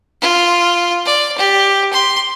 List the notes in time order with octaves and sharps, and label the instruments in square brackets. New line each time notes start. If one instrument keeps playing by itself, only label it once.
[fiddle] F4
D5
G4
C6